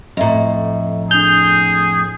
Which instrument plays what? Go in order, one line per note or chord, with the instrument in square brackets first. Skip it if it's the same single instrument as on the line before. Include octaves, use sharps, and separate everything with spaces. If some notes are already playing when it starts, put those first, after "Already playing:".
[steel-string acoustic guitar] F2 A2 [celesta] D#5 E5 A#5
[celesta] D4 F7 [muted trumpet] G#4 [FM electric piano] G6